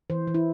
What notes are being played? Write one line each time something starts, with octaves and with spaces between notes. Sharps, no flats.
E3 C5
E3
E4